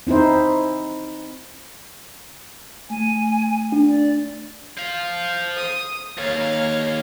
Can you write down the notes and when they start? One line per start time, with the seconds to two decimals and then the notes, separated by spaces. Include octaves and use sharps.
0.07 C4 D#4 E4 C5
2.90 A3 G#5
3.72 D4
3.87 D5
4.78 C5 F5
5.56 D#6
6.17 D#2 C#5 F5